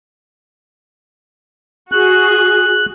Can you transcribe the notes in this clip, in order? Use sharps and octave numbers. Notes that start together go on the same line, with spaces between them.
F#4 G#4 F#6